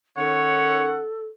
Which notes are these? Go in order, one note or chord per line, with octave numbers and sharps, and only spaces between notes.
D#3 C#4 A4 C#5 F#5